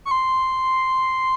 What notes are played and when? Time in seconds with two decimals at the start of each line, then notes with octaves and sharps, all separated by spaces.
0.05 C#6
0.11 C6